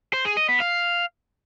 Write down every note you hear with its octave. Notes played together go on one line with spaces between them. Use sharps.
C5
G#4
D#5
B3
F5